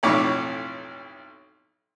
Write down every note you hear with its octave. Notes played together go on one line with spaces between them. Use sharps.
B1 F2 A2 C#5 D5